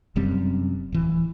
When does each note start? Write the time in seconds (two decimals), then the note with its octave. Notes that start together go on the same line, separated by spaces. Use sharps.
0.16 F1 F#2 G3 C4
0.92 D1 E3